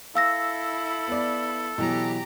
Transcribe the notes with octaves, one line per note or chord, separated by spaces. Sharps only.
E4 A4 F5 E6 A#6
B3 D5
B2 E3 F#3 G4 A#5